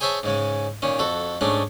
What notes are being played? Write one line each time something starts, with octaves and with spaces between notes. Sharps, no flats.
G#4 C5 C#5 E5 G#5 A5
G#2 C#3 G#3
A#2 D#3 C#4
F2 F#4 A4
G#2 G#3 A3 C#4 D4